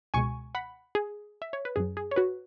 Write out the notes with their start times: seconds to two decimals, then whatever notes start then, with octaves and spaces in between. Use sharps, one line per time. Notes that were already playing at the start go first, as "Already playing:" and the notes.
0.14 C#2 B2 G#3 G#5 C#6
0.55 F#5 B5
0.95 G#4
1.42 E5
1.53 C#5
1.65 B4
1.76 F#2 F#3 G#4
1.97 G#4
2.11 C#5
2.16 F#4 B4